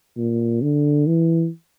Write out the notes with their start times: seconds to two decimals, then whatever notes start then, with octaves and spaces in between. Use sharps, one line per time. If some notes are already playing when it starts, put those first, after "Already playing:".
0.17 A#2
0.62 D3
1.07 E3